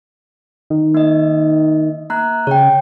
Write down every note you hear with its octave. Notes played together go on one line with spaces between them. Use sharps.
D#3
A#3 D#5
A#3 A#5 F#6
C#3 C#5 G5